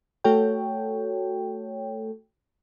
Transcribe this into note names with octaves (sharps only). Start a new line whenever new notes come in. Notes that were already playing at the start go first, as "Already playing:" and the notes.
A3 F#4 A4 C#5 G5